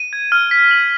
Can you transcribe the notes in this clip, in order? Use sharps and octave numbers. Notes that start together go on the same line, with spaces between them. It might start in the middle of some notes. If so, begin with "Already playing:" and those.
Already playing: D#7
G#6
F6
B6
F#7